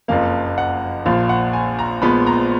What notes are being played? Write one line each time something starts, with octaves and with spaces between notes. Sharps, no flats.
F#1 F2 F3 A#3 F5
F#5
A#1 A#2 F3 F5
F#5
G#5
A#5
A#1 A#2 F3 G#3 B3 B5
A#5